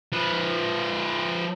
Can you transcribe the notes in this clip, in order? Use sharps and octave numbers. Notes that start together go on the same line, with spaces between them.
F3 B4